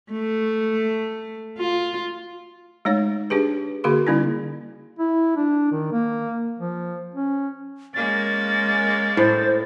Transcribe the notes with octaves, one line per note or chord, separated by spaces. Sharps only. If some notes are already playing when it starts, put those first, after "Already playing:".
A3
F4
G#3 A3 D#4 C#5
D4 G4 G#4 B4
D3 A#3 F#4 G#4 A#4 C6
D3 G3 A#3 C#4 D#4 E4
E4
D4
D#3
A#3
F3
C#4
G#3 A#3 C#4 A6
A2 C5